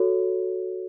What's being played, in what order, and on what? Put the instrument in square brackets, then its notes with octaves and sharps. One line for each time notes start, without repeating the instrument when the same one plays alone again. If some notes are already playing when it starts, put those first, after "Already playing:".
Already playing: [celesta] F#4 A4 C#5